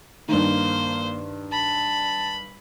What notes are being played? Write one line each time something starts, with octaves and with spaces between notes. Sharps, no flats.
G2 D#3 A#3 C5
A5 B5